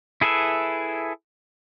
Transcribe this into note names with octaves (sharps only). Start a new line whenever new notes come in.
E4 G#4 A4 B4 E5